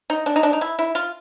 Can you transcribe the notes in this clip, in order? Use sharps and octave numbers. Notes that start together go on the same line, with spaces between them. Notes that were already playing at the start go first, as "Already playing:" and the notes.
D#4
D4
D#4
D4
D#4
E4
E4
F4